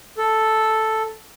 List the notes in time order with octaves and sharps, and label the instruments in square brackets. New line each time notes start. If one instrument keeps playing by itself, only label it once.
[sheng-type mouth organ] A4